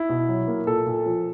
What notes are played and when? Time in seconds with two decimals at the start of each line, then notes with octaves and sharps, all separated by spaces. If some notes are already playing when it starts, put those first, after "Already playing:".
Already playing: E4
0.10 B2
0.29 F#3
0.48 A#3
0.67 A#2 A4
0.87 A#2
1.06 F3